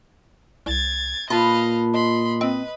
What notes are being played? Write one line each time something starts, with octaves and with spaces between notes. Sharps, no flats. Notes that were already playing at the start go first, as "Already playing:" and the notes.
C2 G#6 A6
A#2 F4 B4 D#5 F5 A5 B5
D#5 B5 C6
C4 B4 D#5